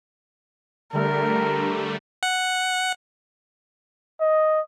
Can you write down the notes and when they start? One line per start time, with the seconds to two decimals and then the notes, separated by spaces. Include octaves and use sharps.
0.93 D3 G3 A3 A#4
2.23 F#5
4.20 D#5